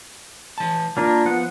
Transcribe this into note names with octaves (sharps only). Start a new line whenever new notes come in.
E3 A5
A#3 D4 F4 A#4
F3 B3 F#5